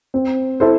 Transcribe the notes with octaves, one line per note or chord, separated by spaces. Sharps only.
C4
E4 A4 C5